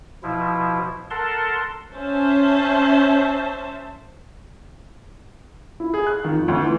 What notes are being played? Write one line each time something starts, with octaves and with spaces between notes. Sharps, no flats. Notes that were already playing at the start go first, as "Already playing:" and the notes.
B2 F3 E4
A4 A#4 F#5 A5 C6
C#4 C5 E5 A5
E4
G#4
F#6
D#3
F2
D2
E3